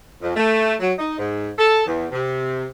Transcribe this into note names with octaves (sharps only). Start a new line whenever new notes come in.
F2
A3
F#3
D#4
G#2
A4
E2
C3